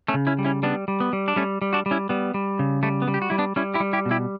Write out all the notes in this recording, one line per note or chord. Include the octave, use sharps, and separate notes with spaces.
A3 C#4
C#3
C#4 E4
G3
C#4 E4
G3 B3 D4
G3
B3
G3
D4
G3 A3 C#4
G3
D4 F#4
G3
C#4 E4
G3 B3
G3
C#3
G3 A3
B3
G3
G4
F#4
G3 E4
B3 D4
G3 C#4 E4
E4 G4
G3
E4 G4
B2
E4 G4